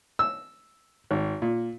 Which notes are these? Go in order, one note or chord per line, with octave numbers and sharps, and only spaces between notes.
E6
G#1
A#2